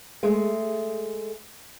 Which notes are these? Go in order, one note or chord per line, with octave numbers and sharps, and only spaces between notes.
G#3 A3